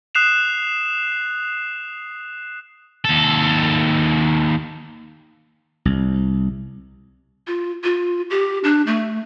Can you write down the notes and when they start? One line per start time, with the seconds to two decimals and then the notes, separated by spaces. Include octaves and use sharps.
0.15 D#6 F#6 C7 E7 F7
3.05 D#2 A4
5.85 C2
7.47 F4
7.84 F4
8.30 G4
8.64 D4
8.87 A3